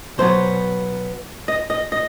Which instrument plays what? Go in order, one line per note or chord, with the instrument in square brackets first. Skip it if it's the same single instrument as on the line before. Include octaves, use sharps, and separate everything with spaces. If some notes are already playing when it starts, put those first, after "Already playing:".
[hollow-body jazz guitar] B2 F#3 B3 C5
D#5
D#5
D#5